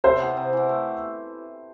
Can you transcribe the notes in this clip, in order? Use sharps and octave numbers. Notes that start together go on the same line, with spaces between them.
C3 C5 E5
E3 B3
C3
E3 B3
A3